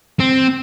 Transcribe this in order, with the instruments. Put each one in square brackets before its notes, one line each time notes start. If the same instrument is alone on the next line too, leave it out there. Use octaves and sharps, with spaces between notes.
[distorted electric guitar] C4